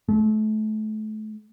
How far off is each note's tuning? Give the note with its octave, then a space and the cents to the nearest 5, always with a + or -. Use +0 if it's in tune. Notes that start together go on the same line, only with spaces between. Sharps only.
A3 -30